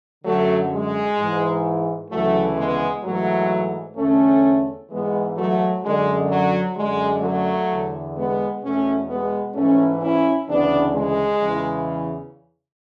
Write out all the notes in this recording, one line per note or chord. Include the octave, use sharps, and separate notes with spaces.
F#2 D3 F#3 A3
G#3
G#2 E3
D2 C#3 E3 F#3 A3
G#3 B3
G#2 E3 F#3 A3
E2 D3 A3 C#4
G#2 E3 G#3 B3
F#3 A3
F#2 D3 G#3
F#3
F#2 D3 G#3
F#3 A3
E2 D3
G#3 B3
E2 B2 A3 C#4
G#3 B3
G#2 E3 A3 C#4
C#4 E4
D2 C#3 E3 B3 D4
G#3
E2 C#3 E3